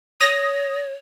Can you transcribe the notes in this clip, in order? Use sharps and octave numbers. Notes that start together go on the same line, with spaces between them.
C#5 D#6 A#6